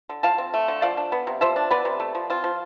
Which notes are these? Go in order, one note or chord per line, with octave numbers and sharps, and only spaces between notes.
D3
F3 F5 A5
C4
A3
D3
F3 D5 F5
D4
B3
C3
F3 C5 E5
D4
B3 B4 D5
C3
A3
F3
C4 F4
F3